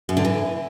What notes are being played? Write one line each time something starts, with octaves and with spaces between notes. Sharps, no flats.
F#2
D3
E3